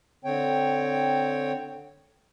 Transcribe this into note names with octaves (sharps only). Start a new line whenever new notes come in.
D3 C4 C#5 G5